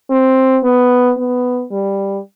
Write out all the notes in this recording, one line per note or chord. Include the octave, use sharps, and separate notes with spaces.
C4
B3
B3
G3